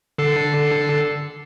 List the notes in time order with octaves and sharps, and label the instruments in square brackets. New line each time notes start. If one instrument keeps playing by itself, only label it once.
[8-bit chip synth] D3 A4 C7